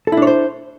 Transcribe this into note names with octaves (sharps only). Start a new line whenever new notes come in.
D4 E4 A4 C5 C#5